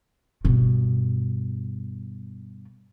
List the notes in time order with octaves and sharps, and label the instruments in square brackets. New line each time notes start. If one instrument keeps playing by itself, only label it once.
[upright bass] G2 B2